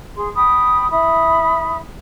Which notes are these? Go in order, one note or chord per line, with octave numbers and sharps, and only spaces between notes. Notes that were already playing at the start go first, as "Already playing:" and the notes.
G#4 C6
G5 B5 D#6
E4 B5 D#6